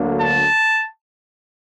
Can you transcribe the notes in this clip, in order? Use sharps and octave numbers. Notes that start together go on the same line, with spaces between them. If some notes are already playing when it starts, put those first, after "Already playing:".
Already playing: D2 D3 F#3 A#3
A5